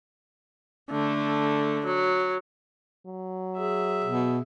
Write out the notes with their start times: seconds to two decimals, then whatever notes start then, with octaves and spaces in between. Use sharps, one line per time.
0.90 D3 A3
1.85 F#3
3.06 F#3
3.57 G#4 E5
4.05 B2